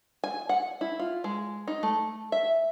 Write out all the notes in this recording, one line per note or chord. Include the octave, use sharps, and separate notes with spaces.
G#5
F#5
E4
F4
G#3
D#4
A3
E5